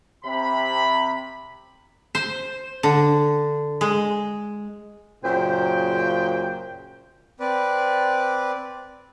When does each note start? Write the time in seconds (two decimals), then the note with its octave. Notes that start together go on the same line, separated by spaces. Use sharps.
0.24 C3 B5
2.15 C5
2.83 D3
3.81 G#3
5.24 F#2 A#2 C#3 C5 G5
7.40 C4 B4 D5